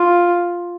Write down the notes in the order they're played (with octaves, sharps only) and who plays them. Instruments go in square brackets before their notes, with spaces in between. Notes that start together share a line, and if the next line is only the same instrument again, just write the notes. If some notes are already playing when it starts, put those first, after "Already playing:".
Already playing: [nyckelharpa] F4